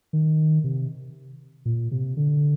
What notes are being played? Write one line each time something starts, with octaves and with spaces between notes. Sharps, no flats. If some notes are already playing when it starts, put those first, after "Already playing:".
D#3
C3
A#2
C3
D3